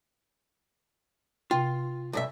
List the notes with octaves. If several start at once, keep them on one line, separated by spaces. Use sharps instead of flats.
C3 F4 G5
B1 G2 E5